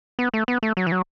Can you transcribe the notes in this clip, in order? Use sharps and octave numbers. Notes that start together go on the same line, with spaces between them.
B3
A3
B3
A3
F#3
E3
F#3